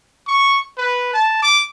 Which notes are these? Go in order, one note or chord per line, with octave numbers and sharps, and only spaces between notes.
C#6
B4
A5
D6